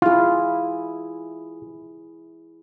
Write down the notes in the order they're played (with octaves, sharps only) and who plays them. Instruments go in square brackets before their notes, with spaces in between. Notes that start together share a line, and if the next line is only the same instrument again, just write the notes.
[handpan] E4 G#4 [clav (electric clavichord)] F4